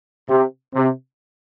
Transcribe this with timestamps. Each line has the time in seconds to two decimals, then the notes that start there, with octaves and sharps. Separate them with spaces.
0.29 C3
0.75 C3